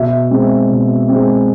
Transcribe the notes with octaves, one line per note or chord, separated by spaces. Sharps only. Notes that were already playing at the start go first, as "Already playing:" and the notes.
Already playing: B2 E5
G#3 C4
B2
G#3 C4